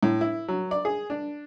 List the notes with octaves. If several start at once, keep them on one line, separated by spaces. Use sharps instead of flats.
A2
E4
F#3
D5
G#4
D4